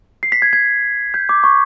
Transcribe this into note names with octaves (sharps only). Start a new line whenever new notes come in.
C7
B6
G#6
G#6
G6
D6
C#6